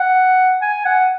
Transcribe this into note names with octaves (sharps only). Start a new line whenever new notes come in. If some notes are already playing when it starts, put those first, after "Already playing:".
Already playing: F#5
G#5
F#5